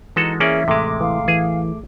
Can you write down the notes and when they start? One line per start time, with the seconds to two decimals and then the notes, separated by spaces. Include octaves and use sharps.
0.16 E3 G#3 D#4 F#4 A4
0.40 A#3 C#4 G#4 D5 E5
0.68 A1 C3 G#3 A3 D6
1.00 E3 F5
1.28 E3 G#4